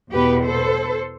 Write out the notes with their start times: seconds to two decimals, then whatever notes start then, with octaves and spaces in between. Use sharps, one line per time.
0.11 E2 B2 B3 G4 B4
0.44 A4 C5